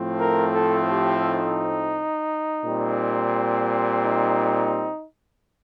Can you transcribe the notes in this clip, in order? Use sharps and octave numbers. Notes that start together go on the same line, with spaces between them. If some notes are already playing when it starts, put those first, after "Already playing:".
Already playing: A2 F3 A3 C4
A#4
A4
G4
D#4
A#2 G3 C4
D#4